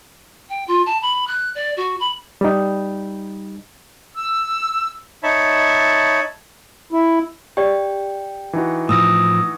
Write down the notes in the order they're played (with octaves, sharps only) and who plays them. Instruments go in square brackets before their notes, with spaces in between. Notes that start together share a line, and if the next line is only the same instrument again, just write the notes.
[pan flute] G5
F4
A5
B5
F#6
D5
F#4
B5
[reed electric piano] G3 D#4
[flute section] E6
[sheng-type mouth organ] D#4 C#5 E5 A5 B5
[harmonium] E4
[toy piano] G4 D5 [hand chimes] G5
[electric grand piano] E3 D#4 F#4
[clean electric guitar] A2 F3 [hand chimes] D#6 E6 A#6